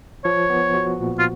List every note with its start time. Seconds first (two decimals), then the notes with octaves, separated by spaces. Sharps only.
0.24 F3 C#5
0.50 B3
0.74 F#4
1.00 A#2
1.19 F4